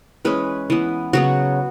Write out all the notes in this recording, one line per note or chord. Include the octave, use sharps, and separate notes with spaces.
E3 G#3 C#4 B4
E3 B3
C#3 F#3 B3 F#4